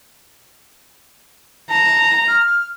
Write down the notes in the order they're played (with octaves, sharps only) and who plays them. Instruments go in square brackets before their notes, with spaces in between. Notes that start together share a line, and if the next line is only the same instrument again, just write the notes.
[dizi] A5 [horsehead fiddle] A#5
[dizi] F6